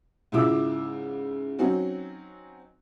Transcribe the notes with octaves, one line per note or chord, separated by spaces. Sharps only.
G#2 C#3 E4 F4 D6 E6
F#3 C4 C#4 D#4 F#4